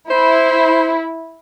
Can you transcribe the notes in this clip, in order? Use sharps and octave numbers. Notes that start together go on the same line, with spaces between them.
E4 C5